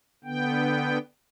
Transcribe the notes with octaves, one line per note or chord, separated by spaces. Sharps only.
D3 B3 G5